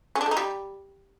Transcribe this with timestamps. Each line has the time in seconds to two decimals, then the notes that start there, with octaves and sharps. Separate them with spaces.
0.15 C#4
0.21 D4
0.26 A3
0.31 D#4
0.37 G3